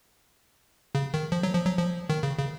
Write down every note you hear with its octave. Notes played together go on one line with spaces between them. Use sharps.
C#3
D#3
F3
F#3
F3
F#3
F3
D#3
C#3
C#3